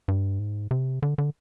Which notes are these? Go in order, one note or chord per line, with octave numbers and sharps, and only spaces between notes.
G2
G#2
C3
D3
D3